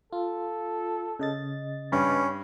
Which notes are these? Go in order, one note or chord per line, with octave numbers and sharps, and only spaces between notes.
F4 A4
C#3 D#5 A6
G2 C#4 B4